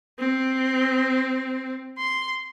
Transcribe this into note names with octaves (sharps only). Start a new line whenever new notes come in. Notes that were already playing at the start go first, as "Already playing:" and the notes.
C4
C6